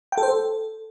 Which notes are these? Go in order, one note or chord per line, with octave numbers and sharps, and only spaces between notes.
G5
A4
C5
A4